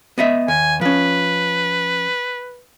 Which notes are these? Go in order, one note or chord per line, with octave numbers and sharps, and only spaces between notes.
B3 D#5 E5
D#2 G#5
F3 C#4 B4